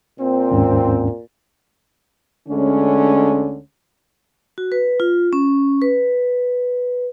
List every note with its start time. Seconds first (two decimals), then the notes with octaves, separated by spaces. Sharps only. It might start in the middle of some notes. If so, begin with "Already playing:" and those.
0.20 A#2 C4
0.51 D#2 G#2 C#4
2.49 D2 D3 G#3 C#4
4.58 F#4
4.72 B4
5.00 F4
5.33 C#4
5.82 B4